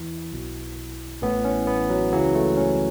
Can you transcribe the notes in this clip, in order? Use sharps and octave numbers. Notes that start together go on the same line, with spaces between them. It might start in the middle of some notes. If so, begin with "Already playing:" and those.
Already playing: E2 E3 E4
B1 B2
A1 A2 E3 B3
C#4
B3
F#3
C#2 C#3 E3 F#3
A3
C#4